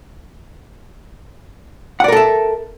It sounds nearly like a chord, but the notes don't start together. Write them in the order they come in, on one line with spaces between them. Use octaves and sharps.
F#5 D5 A#4 A4 E5